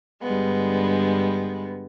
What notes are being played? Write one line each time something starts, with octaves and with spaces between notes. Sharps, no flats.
G2 D3 G3 G#3 B3